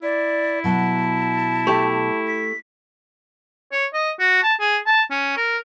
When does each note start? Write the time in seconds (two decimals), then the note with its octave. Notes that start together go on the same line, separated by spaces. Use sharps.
0.02 E4 D5
0.64 B2 F#3 A5
1.67 A3 G4
2.27 B6
3.72 C#5
3.94 D#5
4.19 F#4
4.43 A5
4.60 G#4
4.86 A5
5.10 C#4
5.37 A#4